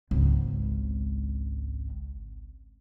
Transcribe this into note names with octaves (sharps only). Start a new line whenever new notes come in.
G#1 C#2